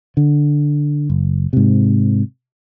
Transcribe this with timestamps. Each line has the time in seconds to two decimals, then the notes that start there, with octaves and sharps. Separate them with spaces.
0.17 D3
1.10 F#1
1.53 G#2 C3